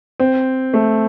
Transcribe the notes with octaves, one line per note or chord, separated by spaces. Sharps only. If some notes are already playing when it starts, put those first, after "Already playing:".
C4
A3